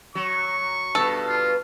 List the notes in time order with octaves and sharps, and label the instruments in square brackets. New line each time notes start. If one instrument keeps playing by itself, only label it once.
[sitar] F#3 [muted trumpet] C#6
[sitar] G2 B2 [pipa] A4
[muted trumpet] F4